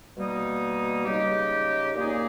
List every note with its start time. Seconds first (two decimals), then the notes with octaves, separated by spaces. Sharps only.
0.16 B2 G3 A#3 D#4
1.06 C#3 G#3 D#4 G4
1.95 A#2 A#3 D#4 G#4